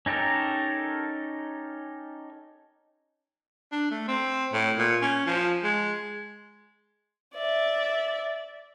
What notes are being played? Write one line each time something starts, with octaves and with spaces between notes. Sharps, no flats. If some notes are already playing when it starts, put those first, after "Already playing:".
C#4 D#4 G4 A4 A#4
D4
A3
C4
A2
A#2
C#4
F3
G#3
D5 E5